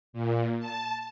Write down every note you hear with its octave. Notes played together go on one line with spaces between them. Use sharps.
A#2
A5